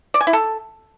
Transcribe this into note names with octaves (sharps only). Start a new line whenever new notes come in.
D5
G#5
E4
A4